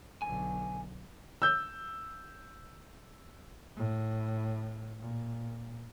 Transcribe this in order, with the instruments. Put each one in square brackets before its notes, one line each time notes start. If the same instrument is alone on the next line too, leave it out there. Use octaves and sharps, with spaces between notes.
[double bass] B1 D3 [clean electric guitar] G#5
[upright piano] E6 G6
[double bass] A2
A#2